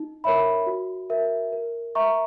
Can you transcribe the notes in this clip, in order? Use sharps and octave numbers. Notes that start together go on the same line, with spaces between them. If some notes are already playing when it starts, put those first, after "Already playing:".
Already playing: D#4
A#4 C#5 E5 B5
F#4
A#4 E5
A#4
E5 A#5 C#6